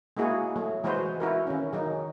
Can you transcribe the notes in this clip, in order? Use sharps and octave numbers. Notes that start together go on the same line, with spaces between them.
G#3 A#3 E4 F#4 G#4
F#3 A3
E3 G#3 F#4 B4 C5
E4 F#4 A#4
D#3 C#4
D#3 F#3 D#4